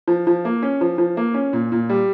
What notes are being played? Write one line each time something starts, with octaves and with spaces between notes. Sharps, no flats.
F3
F3
A#3
C#4
F3
F3
A#3
C#4
A#2
A#2
G3